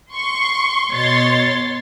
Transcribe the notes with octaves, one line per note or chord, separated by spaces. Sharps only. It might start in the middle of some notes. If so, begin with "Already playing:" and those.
C6 C#6
B2 C#5 C6 A6